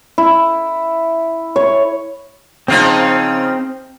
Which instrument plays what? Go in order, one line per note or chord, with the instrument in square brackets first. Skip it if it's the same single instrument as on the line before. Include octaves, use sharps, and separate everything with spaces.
[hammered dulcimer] E4
C#5
[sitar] C#3 F3 D#4 [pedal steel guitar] C4 F5